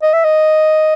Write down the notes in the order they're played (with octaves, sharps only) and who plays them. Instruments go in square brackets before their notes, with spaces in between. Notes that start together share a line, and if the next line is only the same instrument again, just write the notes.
[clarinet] D#5
E5
D#5